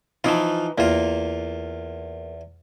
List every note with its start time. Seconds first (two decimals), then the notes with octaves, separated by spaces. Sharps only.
0.24 E3 F3 D#4 F4
0.78 E2 A#3 F4